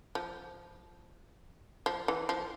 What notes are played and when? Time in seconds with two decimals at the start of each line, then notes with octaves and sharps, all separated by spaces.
0.15 F3
1.86 F3
2.08 E3
2.29 F3